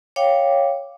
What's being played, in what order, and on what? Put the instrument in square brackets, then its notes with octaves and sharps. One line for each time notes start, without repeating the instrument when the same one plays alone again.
[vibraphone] C#5 F5 G5 D6